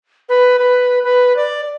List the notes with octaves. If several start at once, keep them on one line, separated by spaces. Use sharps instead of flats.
B4
B4
B4
D5